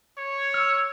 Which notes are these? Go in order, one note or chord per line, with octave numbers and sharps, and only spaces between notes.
C#5
E6 F6